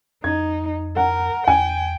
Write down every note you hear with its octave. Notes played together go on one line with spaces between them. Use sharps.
F2 D#4 G#6
A#4 F#5
E2 G5 G#5